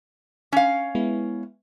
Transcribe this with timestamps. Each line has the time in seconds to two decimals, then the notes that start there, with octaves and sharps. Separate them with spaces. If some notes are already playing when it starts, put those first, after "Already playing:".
0.52 C#4 F5
0.95 G#3 B3 E4